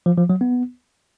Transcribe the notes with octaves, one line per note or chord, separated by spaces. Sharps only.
F3
F3
F#3
B3